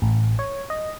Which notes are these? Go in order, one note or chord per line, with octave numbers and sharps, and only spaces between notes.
A1
C#5
D#5